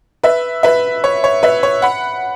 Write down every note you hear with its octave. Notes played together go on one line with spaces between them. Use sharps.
B4 E5
B4 E5
C#5
C#5
B4 E5
C#5
F#5 B5